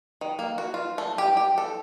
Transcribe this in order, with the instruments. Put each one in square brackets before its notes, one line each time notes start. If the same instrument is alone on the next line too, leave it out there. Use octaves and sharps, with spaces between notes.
[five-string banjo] D#3
A#3
F#4
F4
A3
G4
G4
A4